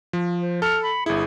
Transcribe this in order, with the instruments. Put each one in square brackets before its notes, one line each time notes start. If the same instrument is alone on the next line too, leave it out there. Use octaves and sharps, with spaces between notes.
[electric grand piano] F3
[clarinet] C5
[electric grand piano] A4 C#7 [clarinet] F6
[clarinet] B5
[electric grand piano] G1 E4 [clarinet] G#4